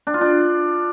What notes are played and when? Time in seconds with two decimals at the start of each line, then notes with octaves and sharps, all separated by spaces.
0.07 D4
0.14 F4
0.21 D4